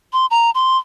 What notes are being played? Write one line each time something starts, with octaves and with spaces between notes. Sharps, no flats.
C6
A#5
C6